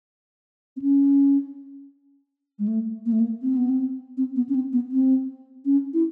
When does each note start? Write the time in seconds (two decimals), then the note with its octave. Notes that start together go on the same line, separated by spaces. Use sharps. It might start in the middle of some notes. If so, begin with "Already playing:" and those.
0.77 C4
0.82 C#4
2.59 G#3
2.68 A3
3.06 A#3
3.12 A3
3.20 A#3
3.42 C4
3.57 B3
3.69 C4
4.17 C4
4.36 B3
4.49 C#4
4.55 C4
4.73 B3
4.92 C4
5.65 C#4
5.94 E4